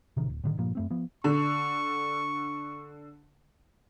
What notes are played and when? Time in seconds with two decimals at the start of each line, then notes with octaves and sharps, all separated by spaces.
0.17 A1 C3 D#3
0.29 D1
0.44 A2 D3 D#3
0.58 G2 A#2 F3 A#3
0.75 F#2 A3 C4
0.91 F3 B3
1.24 D3 C#6